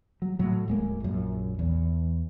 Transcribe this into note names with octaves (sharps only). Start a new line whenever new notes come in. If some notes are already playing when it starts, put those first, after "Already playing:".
F#3
A2 F#3
D1 G#3 A#3
A#1 F#2
E2